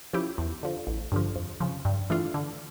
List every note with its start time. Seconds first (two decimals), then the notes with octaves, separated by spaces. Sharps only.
0.13 F3 C#4 E4 G4
0.38 E2
0.63 D3 F3
0.87 A1
1.12 G2 D3 F3
1.36 F2
1.60 C#3 F3
1.85 G2
2.10 E3 A3 D4 F4
2.34 D3